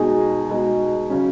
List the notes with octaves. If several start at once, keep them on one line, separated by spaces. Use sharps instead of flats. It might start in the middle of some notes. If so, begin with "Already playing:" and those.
Already playing: B2 G#3 D#4 G#4
B2 G#3 D#4 G#4
C#3 F#3 C#4